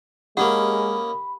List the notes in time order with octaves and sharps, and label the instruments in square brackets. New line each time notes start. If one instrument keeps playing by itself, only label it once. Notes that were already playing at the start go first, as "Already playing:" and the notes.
[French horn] G#3 [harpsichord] A#3 C#4 D#4 [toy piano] G4 F#5 [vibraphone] B5